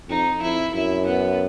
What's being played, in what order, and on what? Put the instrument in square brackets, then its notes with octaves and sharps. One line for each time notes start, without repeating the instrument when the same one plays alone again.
[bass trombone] F2 [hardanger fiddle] D#4
[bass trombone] F2 [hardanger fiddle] E4
[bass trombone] F#2 [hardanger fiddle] E4
[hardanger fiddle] B3